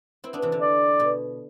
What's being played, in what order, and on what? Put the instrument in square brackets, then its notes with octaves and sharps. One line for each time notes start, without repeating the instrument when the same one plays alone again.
[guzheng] C4 E4
B3 D4
C3 E3
D3
[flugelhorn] D5
[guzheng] B2